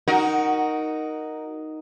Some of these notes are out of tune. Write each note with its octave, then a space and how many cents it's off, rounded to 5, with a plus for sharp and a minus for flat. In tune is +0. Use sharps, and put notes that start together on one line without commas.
D#4 +0 F#4 +0 A#4 +0